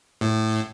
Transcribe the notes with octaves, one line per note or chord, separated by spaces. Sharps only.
A2